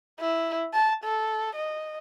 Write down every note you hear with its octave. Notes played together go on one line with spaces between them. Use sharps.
E4
A5
A4
D#5